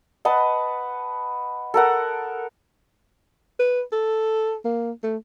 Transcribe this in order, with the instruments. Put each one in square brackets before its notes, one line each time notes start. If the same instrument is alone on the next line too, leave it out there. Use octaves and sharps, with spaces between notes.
[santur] B4 D#5 F#5 A5
A4 A#4 F#5
[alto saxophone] B4
A4
A#3
A3